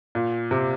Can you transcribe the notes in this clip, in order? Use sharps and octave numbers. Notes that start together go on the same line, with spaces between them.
A#2
C3